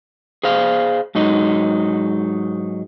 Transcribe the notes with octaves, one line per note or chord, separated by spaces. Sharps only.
G#4 C5 F5
G#2 F#3 D#4